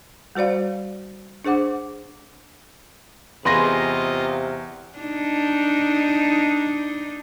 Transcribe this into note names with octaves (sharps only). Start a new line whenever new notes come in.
G3 F#4 C5 D5 F5
D4 G#4 C5 F#5 D6
E2 C3 F4 G#4 B4 D#5 C6 A#6
D4 D#4